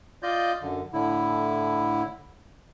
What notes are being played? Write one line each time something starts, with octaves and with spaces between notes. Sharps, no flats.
F4 D5 D#5 G6
F#2 D3
A2 D3 E4